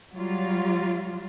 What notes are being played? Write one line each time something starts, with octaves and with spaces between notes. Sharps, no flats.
F#3 G3 F4